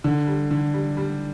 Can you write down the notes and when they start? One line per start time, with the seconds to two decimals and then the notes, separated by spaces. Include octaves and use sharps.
0.04 D3
0.27 G3
0.51 D3
0.74 G3
0.97 G3